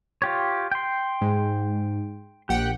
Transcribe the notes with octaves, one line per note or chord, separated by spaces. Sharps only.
F4 G4 C#5
G5 C6
G#2
A#1 G4 F#5 G5